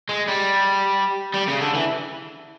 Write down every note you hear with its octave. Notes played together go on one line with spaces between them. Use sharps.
G#3
G3
G3
C#3
D3
E3